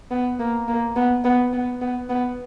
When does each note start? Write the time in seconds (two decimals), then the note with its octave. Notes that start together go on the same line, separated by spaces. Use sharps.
0.11 B3
0.39 A#3
0.68 A#3
0.96 B3
1.24 B3
1.53 B3
1.81 B3
2.09 B3